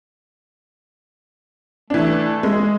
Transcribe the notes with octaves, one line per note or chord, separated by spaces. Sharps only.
E3 A3 D4
G#3